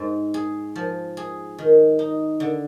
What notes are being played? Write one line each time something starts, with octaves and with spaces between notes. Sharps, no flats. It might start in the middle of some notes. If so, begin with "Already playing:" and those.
Already playing: G#2
G#4
F3
G#4
D#3
D#4
D3